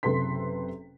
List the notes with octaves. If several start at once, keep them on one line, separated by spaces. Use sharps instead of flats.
F#1 C3 A4 B4 C6 B6